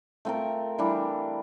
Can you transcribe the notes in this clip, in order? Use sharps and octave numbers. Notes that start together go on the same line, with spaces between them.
A3 C4 F4 A#4
E3 G3 D4